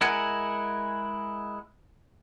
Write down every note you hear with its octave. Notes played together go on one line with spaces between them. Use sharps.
G#3 E4 A#4 F#5 G#5